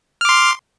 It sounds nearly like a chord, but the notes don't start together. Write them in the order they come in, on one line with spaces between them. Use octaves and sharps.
F6 D6 C6